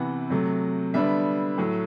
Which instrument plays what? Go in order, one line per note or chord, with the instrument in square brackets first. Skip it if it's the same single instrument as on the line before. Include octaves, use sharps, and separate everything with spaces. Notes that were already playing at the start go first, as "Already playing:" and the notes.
Already playing: [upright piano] C3 E3 B3 F#5
C3 F#3 A3
D3 G3 B3 D4 E5
A2 F#3 A3